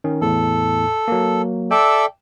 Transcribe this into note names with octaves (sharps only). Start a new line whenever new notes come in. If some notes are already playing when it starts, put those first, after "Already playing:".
D#3 C#4
E2 A2 A4
F#3 A#3
A4 D5 E5 G5